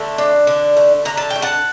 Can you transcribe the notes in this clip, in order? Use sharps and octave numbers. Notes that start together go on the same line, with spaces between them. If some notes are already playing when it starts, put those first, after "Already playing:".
Already playing: D3 A3 A5
D4
D3
A3
D3 A#5
A5
G5
A3
F#5 A5